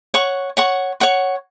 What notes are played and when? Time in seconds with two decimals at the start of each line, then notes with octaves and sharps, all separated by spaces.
0.14 C#5 F#5 C#6
0.57 C#5 F#5 C#6
1.00 C#5 F#5 C#6